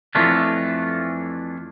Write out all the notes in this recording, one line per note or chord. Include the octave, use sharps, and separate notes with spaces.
F2 E3 A3 D4 F4